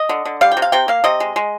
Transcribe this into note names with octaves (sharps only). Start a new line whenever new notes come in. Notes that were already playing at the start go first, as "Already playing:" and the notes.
Already playing: D#5
D3
D3
G3 F5
G5
C3
F5
C3 G5
A#3 F5
C3 D#5
G#3
G#3